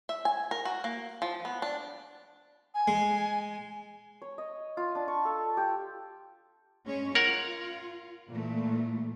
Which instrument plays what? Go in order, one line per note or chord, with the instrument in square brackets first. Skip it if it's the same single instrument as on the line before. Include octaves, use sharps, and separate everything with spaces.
[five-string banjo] E5
G#5
A#4
F#4
A#3
F3
B3
D4
[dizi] G#5
[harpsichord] G#3
[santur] C#5
D#5
F4
D4
C#6
A4
G4
[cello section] G#3 C#4 C#5
[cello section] F4 [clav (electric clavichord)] A#4 C#5 F#5
[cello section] A#2 E3 A3